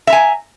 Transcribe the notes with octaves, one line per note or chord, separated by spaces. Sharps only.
E5 G#5 A#5